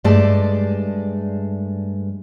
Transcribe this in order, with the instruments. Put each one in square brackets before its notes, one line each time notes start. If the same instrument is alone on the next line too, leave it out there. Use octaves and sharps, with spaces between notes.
[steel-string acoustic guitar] G2 G#3 A3 D5 A5